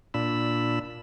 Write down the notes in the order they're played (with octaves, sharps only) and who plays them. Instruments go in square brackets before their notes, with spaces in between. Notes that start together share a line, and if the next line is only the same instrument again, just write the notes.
[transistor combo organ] A#2 D4 B5 E6